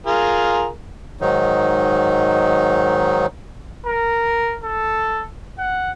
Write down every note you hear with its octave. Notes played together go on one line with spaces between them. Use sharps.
F4 G#4 A#4
G#2 D#3 F#3 D#4
A#4
A4
F#5